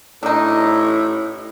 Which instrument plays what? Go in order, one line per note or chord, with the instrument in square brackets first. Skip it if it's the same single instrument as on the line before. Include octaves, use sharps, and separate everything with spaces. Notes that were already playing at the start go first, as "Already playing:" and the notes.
[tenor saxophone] A2 [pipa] D4 D#4